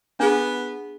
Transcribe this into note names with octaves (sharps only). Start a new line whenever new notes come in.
B3 D4 G#4